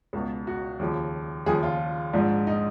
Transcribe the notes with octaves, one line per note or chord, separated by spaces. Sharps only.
C#2 B2
F#4
D#2 C#3 F3
D#2 C#3 F3 G#4
F4
A#1 G#2 F3
D#4